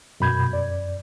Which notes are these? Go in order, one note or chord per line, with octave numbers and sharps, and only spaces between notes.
F#2 B2 B5 G6 G#6
F#2 D5